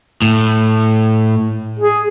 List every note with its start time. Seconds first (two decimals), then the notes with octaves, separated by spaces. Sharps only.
0.22 A2
1.79 G#4